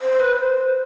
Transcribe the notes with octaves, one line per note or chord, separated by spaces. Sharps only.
C5
B4
C5